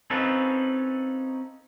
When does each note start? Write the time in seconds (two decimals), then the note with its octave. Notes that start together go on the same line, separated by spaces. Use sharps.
0.10 C4 C#4 D#4 F4 A4 B4